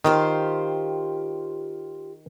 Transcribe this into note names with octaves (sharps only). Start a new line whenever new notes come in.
D#3 F4 G4 C5